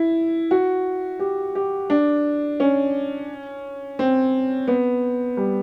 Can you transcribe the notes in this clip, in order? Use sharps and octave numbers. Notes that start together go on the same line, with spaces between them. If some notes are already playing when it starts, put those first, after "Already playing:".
Already playing: E4
F#4
G4
G4
D4
C#4
C4
B3
G3